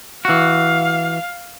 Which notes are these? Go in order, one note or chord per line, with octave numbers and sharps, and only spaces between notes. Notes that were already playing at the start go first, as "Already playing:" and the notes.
E3 F#4 F5